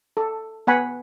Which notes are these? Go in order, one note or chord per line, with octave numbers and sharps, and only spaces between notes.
A4
B3 F#5 G#5 B5